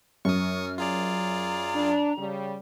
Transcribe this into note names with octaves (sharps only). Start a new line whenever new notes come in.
F#2 C#6 D#6 F6
F4 G#4 D5 A#5
D4
C#3 G3